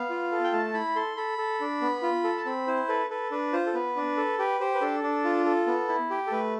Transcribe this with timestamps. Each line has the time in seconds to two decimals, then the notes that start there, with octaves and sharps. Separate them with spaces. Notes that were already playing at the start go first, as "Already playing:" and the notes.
Already playing: B3 F5
0.10 F4
0.32 A4
0.44 G5
0.53 A3 A5
0.74 E4 B5
0.96 A4 C6
1.17 A4 B5
1.38 A4
1.61 D4
1.81 B3
2.03 F4
2.24 A4
2.37 A5
2.46 C4 B5
2.67 E4 C5
2.88 A4 B4
3.10 A4 B4
3.31 D4 B4
3.53 F4 C5
3.66 A4
3.74 B3 B4
3.96 D4
4.17 A4
4.39 G4 B4
4.60 G4 C5
4.74 B4
4.81 D4 A4
5.03 D4
5.24 F4
5.46 A4
5.67 B3
5.89 E4
6.10 G4
6.27 A4
6.32 A3 B4